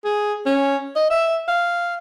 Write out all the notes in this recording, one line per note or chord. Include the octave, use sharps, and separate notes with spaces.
G#4
C#4
D#5
E5
F5